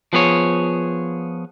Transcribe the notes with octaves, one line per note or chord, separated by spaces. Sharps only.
F3 B3 G#4 C#5